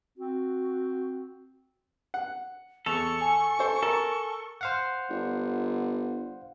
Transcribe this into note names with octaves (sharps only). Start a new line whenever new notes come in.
C4 F#4
F#5
E2 A4 C#6 F7
G#5
A4 C5
A4 A#4
C5 F5 F#5
G1